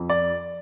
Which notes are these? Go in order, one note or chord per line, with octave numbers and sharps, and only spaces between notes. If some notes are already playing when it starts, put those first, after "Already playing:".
Already playing: F2
D5